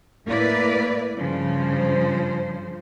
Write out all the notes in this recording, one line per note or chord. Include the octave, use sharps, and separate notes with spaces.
A2 A#3 E4 B4 D5
G2 C#3 F3 C5